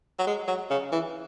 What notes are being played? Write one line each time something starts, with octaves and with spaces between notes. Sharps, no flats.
F#3
G#3
F#3
C#3
E3